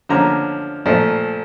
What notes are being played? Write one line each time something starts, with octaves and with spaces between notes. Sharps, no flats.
D3 F3 A#3 C#4 A#5
A#2 F3 A3